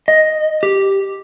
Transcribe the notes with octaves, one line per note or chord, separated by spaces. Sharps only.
D#5
G4